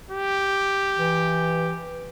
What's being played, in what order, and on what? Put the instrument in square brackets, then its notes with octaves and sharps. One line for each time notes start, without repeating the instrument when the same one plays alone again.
[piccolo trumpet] G4
[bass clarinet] E3